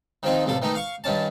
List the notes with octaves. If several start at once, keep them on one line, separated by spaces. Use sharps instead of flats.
D#3 F3 C4 D#4
A1 C3 F3 A4
D#3 E3 A3 D#4
F5 C#6
G2 D#3 C#4 A5